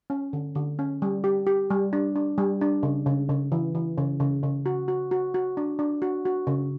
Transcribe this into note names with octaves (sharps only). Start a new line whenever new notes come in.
C#4
D3
D3
C#4
G3
G4
G4
G3
D4
D4
G3
D4
C#3
C#3
C#3
E3
E3
C#3
C#3
C#3
F#4
F#4
F#4
F#4
D4
D4
F#4
F#4
C#3